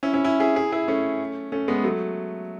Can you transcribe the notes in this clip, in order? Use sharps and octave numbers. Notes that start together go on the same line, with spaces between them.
C#4 E4
C#4 E4
C#4 E4
E4 G#4
E4 G#4
E4 G#4
A3 C#4
A3 C#4
G#3 B3
F#3 A3